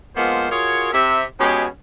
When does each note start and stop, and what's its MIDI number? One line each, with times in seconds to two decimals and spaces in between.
0.16 0.50 53
0.16 0.50 56
0.16 0.50 58
0.16 0.50 59
0.16 0.50 65
0.16 0.50 72
0.51 0.92 65
0.51 0.92 66
0.51 0.92 68
0.51 0.92 70
0.51 0.92 73
0.93 1.24 48
0.93 1.24 76
1.39 1.66 47
1.39 1.66 56
1.39 1.66 59
1.39 1.66 61
1.39 1.66 67
1.39 1.66 68